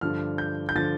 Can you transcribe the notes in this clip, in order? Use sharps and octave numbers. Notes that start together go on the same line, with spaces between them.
G2 D3 F3 F6
G6
G6
D3 F3 A6